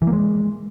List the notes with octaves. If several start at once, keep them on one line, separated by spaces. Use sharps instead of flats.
E3
A#3
G#3